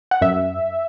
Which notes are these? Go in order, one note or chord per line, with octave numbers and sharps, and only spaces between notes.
F#5
F#2 E5